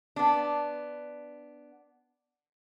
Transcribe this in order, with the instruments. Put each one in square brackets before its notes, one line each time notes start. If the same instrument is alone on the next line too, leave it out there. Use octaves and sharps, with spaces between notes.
[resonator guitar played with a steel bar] B3 D4